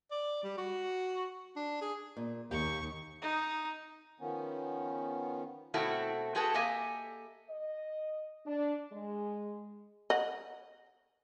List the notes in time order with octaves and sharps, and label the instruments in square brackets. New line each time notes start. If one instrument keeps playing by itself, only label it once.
[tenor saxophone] D5
G3
F#4
D4
G#4
[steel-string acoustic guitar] A#2
[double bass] D#2 [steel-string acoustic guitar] A#3 G4 [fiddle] C#6
[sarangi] D#4
[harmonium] D#3 F3 B3 C#4
[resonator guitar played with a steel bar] B2 A3 C4 E4 F#4 A4
C4 F#4 G#4 A4 B4 A5
A#3 G4 A4 D#5 E5 G#5
[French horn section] D#5
D4
G#3
[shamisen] D#5 F#5